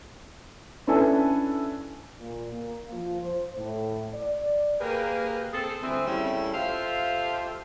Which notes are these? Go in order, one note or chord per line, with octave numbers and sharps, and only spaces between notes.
C#4 D4 E4 A4 B4 G#5
A#2
A#3
F3
C5
A2
D5
A#3 G4 G#4 A#4 B4
C4 G#4 A4
D2 E3 G3 C4
C#3 G3 A3 C#4 E4
F4 G4 A4 C5 E5 F5